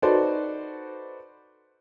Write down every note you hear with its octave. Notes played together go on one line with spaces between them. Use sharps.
D#4 F#4 A4 B4 C5 D5